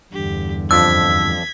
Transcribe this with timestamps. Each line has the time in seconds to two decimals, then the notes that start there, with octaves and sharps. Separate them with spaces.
0.13 E2 G2 D3 G4
0.71 F2 F3 D4 E6 G#6 B6